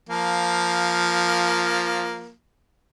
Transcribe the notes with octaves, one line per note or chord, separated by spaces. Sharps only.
F3 A#3